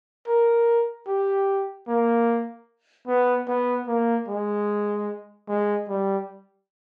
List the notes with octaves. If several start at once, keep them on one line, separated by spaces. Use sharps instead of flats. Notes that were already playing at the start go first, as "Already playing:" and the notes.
A#4
G4
A#3
B3
B3
A#3
G#3
G#3
G3